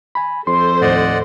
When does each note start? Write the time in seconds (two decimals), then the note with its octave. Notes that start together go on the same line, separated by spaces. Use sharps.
0.15 G#5 B5
0.47 F2 A4 C5 C6
0.82 D#2 A2 D5 D#5 F#5